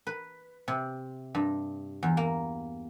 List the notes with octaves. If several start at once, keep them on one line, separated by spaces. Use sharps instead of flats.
B4
C3
G2
E2
A#3